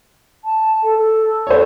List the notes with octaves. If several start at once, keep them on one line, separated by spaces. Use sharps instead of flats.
A5
A4
A4
C5 C#5